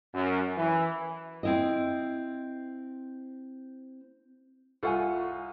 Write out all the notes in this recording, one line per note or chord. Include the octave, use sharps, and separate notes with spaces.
F#2
E3
C4 E4 D#5
C2 F4 A4 F#5 G#5 C#6